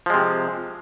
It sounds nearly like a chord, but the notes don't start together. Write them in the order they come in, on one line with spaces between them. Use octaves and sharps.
F3 G#3 C3